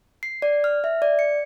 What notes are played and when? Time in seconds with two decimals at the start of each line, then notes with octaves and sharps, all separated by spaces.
0.23 C7
0.42 D5
0.64 F6
0.84 E5
1.02 D5
1.19 C#7